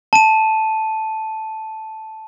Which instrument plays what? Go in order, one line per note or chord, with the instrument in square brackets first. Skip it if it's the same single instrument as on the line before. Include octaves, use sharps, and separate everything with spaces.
[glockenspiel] A5 D#7